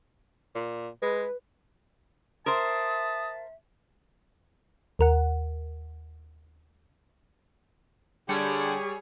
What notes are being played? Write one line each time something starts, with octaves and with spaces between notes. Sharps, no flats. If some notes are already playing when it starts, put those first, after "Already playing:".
A#2
G#3 B4
A#4 C5 E5 A5 D#6
D#2 A#4 F#5
D3 G3 G#4 C#5